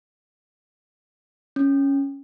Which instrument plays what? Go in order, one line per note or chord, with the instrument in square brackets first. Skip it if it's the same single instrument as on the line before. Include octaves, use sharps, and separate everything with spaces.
[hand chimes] C#4